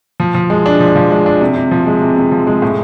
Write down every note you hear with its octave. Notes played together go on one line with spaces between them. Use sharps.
F3
F3
G#3
D4
F3
F3
G#3
D4
C3
C3
F3
G#3
C3
C3
F3
G#3
A2